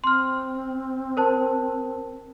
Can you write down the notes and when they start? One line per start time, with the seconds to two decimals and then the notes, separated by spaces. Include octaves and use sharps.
0.04 C4 C6 F6
1.17 A#4 C5 A5